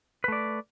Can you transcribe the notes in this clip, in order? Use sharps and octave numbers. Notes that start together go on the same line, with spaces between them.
A3 B4 D5